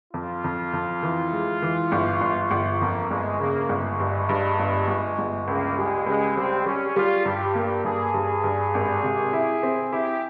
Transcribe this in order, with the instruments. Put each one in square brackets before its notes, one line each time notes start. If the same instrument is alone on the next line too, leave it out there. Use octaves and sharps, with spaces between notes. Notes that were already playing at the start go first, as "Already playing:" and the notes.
[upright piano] F2 [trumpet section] F4
[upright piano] F2
F2
E3
G#3
E3
G1
G1
G1
[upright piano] F2 [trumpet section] A#3
[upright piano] G1 [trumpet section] G#3
[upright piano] C#3 [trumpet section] A#3
[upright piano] G1 [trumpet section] G#3
[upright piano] G2
G2
G1
G1
G1
[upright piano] C#2 [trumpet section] A#3
[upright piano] G3 [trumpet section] G#3
[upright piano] C#2 [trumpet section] G#3
[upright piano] G3 [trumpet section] C4
[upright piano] G3 [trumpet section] C#4
[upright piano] G3 [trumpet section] F4
[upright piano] G2 [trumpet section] G4
[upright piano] A#3 [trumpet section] G4
[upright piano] G2 [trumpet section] G#4
[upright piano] G2 [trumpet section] G#4
[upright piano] G2
G#1
C3
E4
C4
[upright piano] E4 [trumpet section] G4